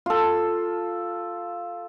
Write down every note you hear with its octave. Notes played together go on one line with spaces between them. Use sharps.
F4 A4